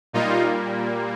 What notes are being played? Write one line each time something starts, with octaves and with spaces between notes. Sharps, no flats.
A#2 G3 A#3 D#4 F4